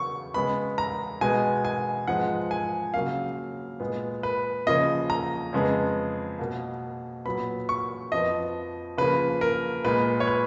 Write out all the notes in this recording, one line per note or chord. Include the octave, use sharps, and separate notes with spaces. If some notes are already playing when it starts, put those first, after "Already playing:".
Already playing: C#3 F#3 B3 C#6
C#3 G#3 B3 B5
A#5
B2 G#3 B3 G#5
G#5
G#2 F3 G#3 B3 F#5
G#5
C#3 F#3 A#3 F5
A#2 G#3 B3
B4
C#3 F3 A#3 D#5
A#5
F2 C#3 G#3 B3
B2 A#3
A#2 F#3 B3 B5
C#6
F2 F3 B3 D#5
C#3 F3 A#3 B4
A#4
A#2 G#3 B3 B4
C#5
B4